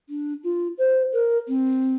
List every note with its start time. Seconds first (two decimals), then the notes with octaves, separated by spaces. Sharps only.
0.09 D4
0.43 F4
0.78 C5
1.13 A#4
1.48 C4